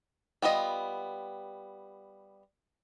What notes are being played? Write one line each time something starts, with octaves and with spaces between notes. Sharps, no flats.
G3 B3 F4 D#5